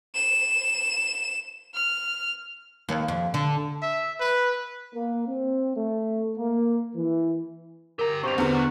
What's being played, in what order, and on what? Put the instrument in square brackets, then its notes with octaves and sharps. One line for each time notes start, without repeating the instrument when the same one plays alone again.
[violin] E7
F6
[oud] D#2
F2
D3
[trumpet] E5
B4
[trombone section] A#3
C4
A3
A#3
E3
[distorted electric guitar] G4 A#5 [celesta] A#4
[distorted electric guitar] G2 B2 [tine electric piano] C4 G4 C5 [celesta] C#6 F7
[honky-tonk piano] E2 D3 [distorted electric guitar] F#4 A#4 [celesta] G#4 B4
[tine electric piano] C#6 F#6